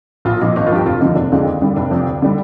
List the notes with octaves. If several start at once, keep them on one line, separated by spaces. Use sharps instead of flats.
A#1 F4
A#2 F3 D#4
G#1 D#4
F4
G2 F3 G4
F1 F4
D#2 D3 F3 D#4
F1 D4
F2 D3 G#3
D#2
D3 G3
F1 D4
F2 C3
D2
D3 G3